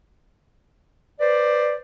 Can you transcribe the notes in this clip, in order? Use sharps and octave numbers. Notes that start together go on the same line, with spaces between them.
B4 C5 D5